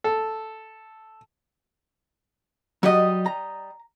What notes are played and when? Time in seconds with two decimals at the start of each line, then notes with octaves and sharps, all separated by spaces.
0.04 A4
2.83 F#3 G3 F#4 G4 D#5
3.26 A#5